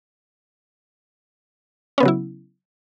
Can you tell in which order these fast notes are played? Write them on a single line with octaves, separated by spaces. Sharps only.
C#4 B3 C#3 F#3 E4